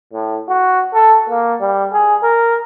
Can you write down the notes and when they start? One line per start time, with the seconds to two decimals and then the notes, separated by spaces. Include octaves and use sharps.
0.14 A2
0.49 F#4
0.94 A4
1.29 A#3
1.61 G3
1.93 G#4
2.23 A#4